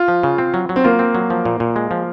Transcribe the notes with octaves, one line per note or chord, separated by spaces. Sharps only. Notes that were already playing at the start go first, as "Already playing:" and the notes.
Already playing: F4
F3
C#3
C4
F#3
F#3
C4
A#3 F4
C4
F#3
F3
A#2
A#2
G#3
F3